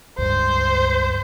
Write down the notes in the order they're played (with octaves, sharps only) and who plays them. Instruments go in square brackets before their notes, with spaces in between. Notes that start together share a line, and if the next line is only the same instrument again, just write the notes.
[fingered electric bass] C#2 G2 [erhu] C5